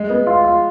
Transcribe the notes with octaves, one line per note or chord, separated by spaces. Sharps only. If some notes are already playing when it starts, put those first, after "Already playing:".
Already playing: G#3
B3
F4
F4